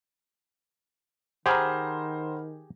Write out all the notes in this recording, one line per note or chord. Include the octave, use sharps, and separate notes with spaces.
D#3 G4 G#4 C5 F#5 A#5 B5 F6